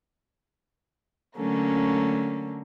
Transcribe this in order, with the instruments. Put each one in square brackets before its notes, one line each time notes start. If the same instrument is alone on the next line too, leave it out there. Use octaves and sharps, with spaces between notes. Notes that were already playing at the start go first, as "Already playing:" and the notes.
[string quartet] D3 F#3 A3 A#3 C#4